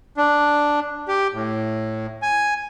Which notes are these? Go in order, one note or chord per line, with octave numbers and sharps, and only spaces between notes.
D4
G4
A2
G#5